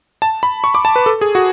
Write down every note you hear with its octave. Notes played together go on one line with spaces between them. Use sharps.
A5
B5
C#6
D6
A5
B4
A4
G#4
F#4